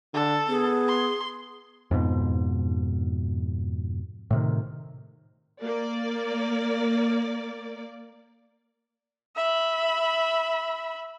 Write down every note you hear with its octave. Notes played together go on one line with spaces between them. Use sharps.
D3 A4
B3 G#4
C6
F2 G#2 B2
A2 C3 D#3
A#3 D5
E5 B5